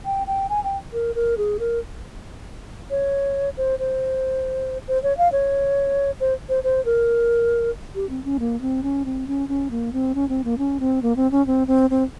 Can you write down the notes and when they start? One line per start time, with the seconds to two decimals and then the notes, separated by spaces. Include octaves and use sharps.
0.06 G5
0.27 G5
0.50 G#5
0.64 G5
0.93 A#4
1.15 A#4
1.38 G#4
1.60 A#4
2.90 C#5
3.57 C5
3.79 C5
4.88 C5
5.03 C#5
5.18 F5
5.32 C#5
6.20 C5
6.49 C5
6.64 C5
6.85 A#4
7.95 G4
8.10 C4
8.24 C#4
8.39 A#3
8.61 C4
8.83 C#4
9.05 C4
9.27 C#4
9.48 C#4
9.71 A#3
9.93 C4
10.15 C#4
10.29 C4
10.44 A#3
10.58 C#4
10.80 C4
11.02 A#3
11.16 C4
11.31 C#4
11.47 C4
11.67 C4
11.90 C4